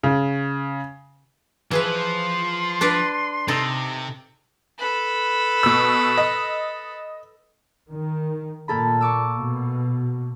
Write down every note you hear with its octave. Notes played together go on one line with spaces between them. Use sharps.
C#3
E3 F3 G#4 B4 C5
C6
D4 B4 D5
C3 D#4 A4
A4 B4
B2 E6
D#5
D#3
A#2 A#3 A4 B5
C#6 D6 E6
B2